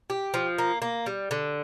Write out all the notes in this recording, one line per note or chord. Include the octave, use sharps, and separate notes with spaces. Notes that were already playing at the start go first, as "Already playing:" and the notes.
G4
F3
A#3
A#3
G3
D3